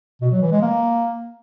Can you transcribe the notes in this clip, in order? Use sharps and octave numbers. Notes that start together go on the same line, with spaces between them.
B2
F#3
E3
G#3
A#3